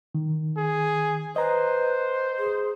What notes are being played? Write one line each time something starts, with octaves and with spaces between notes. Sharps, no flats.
D#3
G#4
B4 C5 D#5 A#5
G#4